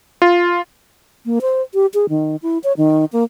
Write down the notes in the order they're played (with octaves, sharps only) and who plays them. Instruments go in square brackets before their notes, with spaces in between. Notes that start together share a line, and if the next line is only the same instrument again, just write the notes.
[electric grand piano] F4
[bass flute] A#3
C5
G4
G#4
D#3
E4
C#5
D#3
A#3